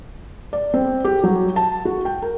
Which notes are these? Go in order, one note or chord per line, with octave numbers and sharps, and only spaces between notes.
D5
C4
G4
F#3
A5
F#4
G5
A#4